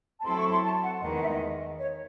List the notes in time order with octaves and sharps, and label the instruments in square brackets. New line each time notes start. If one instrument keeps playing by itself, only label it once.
[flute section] A5
[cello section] F#3 C4 E4 A4 [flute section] C6
[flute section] C#6
C6
A5
F#5
[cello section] E2 D#3 G#3 [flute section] D#5
[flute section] F#5
E5
D#5
C#5